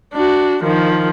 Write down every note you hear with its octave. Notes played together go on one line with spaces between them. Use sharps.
D4 F#4
D#3 F3